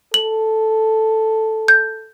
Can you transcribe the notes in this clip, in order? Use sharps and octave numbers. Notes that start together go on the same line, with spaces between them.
A4 F#7
G6